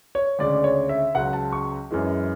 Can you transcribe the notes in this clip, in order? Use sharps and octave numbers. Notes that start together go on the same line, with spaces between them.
C#5
D2 C#3 G#3 D5
C#5
E5
C#2 C#3 F#3 F#5
A5
C#6
F#2 E3 G#3